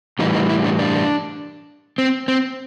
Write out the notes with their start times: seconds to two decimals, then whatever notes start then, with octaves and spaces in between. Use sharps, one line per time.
0.19 A2 E3 G3 D#4
0.34 D#4
0.49 E4
0.64 D4
0.79 D4
1.98 C4
2.28 C4